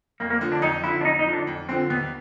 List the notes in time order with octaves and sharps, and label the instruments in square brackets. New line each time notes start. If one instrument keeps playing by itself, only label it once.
[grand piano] F2 [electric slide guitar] A#3
[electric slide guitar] A#3
[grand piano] D3 F3
[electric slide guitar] D4
[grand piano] F2 [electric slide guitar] D#4
[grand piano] D3 [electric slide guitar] E4
[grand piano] F3
[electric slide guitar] D4
[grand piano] F2 [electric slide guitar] D#4
[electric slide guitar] D#4
[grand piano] D3 F3
[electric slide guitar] D4
[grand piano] F2
[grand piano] D3 F3 [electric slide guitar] C4
[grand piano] D#2 [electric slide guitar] B3